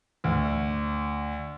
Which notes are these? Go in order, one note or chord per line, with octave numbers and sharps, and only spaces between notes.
D2